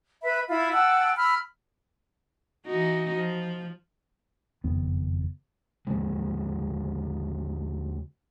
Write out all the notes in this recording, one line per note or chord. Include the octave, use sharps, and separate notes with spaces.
B4 E5 B5
E4 F4 B5
F#5 G5 A5 E6
B5 E6 F6
E3 D#4 F#4
F3
F#1 F2 D#3 B3
D#2 D3 F3 G#3